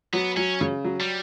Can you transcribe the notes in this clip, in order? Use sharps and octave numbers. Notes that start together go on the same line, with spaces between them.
F#3 B3
F#3 C#4
C#3
F#3
G3